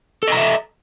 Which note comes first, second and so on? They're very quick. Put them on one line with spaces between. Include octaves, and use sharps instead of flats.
A4 D#5 A#5 E5